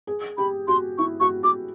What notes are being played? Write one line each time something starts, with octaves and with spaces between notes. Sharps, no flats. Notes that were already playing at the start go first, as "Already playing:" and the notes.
G#4
G4 B5
F#4 C6
E4 C#6
F#4 C#6
F#4 D6